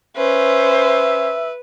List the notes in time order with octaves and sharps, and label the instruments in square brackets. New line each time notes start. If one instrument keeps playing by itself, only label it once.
[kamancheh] C#4 C5 [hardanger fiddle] B4 [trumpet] E5